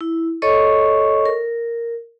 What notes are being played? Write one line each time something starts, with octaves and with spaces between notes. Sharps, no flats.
E4
A4 C#5 D#5 C#6
A#4